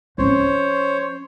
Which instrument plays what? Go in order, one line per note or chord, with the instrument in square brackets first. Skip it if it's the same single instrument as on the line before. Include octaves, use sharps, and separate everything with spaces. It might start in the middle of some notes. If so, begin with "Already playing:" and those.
[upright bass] F3 C#4 [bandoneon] C5 C#5